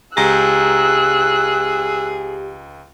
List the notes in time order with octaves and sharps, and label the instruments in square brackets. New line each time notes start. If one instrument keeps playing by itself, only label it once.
[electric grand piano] C#2 A#5 A#6 [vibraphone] G4 [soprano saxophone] G#4 [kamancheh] E6 F#6